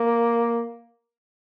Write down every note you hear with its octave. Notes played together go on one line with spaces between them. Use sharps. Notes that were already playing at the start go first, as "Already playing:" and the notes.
Already playing: A#3